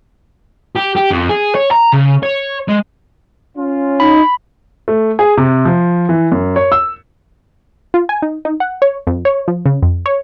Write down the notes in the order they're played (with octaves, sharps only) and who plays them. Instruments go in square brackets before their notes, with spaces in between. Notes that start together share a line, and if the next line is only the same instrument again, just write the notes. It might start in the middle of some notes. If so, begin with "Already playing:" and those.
[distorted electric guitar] G4
G4
F2
G#4
C#5
A#5
C#3
C#5
G#3
[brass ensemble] C#4 F4
[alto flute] D#4 [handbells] B5
[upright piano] A3
G#4
C3
F3
E3
F#2
C#5
E6
[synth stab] F4
G#5
D#4
D#4
F#5
C#5
F2
C#5
F3
C#3
F2
C#5